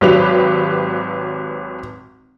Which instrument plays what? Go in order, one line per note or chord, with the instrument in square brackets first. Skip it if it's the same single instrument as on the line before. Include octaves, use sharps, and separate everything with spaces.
[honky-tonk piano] G#1 F#3 G4 B4 F7